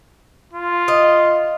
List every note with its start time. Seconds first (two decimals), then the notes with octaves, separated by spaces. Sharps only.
0.53 F4
0.88 D#5